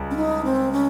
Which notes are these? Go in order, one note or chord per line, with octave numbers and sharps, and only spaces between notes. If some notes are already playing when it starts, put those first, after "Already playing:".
Already playing: C#2 G3
C#4
D#4
C4
C#4